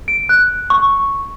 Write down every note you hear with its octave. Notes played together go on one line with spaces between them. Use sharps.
D7
F#6
C#6